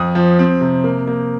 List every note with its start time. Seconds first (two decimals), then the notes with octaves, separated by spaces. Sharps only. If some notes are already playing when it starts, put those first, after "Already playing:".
Already playing: F2 D#6
0.15 F3
0.39 C4
0.61 C3
0.84 A#3
1.08 A#3